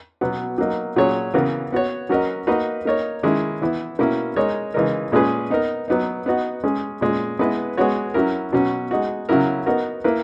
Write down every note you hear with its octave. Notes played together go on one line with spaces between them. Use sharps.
B2 F#3 B3
F#3 A#3 D#4
A#2 F#3 C#4 G#4 C#5
C#3 E3 B3 F#4 A#4
B3 F#4 C#5
F#3 C#4 F#4 A#4 D#5
A#3 D#4 F#4 B4 D#5
A#3 D#4 A#4 C#5
D#3 G#3 C#4 E4
E3 B3 E4
B2 A#3 C#4 E4
G#3 D#4 A#4 C#5
C#3 E3 G#3 D#4 A#4
A#2 G#3 C#4 G#4 B4
B3 D#4 A#4
F#3 B3 D#4
B3 D#4 F#4
G#3 C#4 G#4
A#2 G#3 C#4
G#3 B3 E4 B4 D#5
G#3 B3 F#4 C#5
F#3 C#4 E4 A#4
B2 F#3 C#4
G#3 D#4 F#4
C#3 F#3 C#4 E4 A#4
B3 D#4 F#4 A#4
A#3 E4 B4